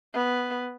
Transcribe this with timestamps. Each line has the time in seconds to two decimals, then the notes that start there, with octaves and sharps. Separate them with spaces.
0.14 B3